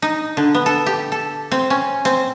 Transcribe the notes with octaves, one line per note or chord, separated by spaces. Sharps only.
D#4
D3
B3
A4
G4
A4
C4
C#4
C4